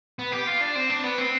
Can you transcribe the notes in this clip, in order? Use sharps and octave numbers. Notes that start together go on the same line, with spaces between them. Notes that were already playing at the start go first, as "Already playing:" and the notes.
B3
G4
F4
D4
C4
D4
B3
C4